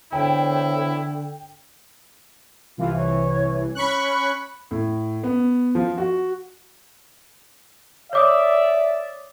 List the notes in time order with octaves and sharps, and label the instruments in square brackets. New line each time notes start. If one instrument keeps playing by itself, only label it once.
[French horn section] E2 C5 C#5 [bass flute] D3 [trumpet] E4 [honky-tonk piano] G5
[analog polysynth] C2 E3 [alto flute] F4
[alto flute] C#5
[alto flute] C#4 [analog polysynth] B5 C#6 F#6
[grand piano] A2
B3
F3
F#4
[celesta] C#5 D6 D#6 [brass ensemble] D5 E5